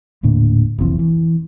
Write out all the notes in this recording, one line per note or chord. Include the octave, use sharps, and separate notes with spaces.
D#1 A2 D3 A#3
F1 B1 E3 C4
E3